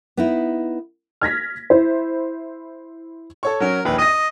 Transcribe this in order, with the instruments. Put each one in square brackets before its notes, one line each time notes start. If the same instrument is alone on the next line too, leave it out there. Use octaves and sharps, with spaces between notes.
[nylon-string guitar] B3 D#4 E4
[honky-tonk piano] F6 G#6 A#6 B6
E4 C5
[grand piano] A4 C#5 C#6
[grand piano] F#3 C#4 [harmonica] A#4
[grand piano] A#1 D#2 [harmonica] B4
[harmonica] D#5 [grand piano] A#6 D#7